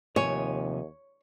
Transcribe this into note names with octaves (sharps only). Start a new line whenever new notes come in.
D#2 C3 F3 C#5 G#5